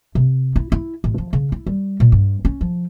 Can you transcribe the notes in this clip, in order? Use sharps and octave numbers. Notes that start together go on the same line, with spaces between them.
C3
E4
E4
A1
F3
C#3
E4
G3
A#2
G2
C#4
F3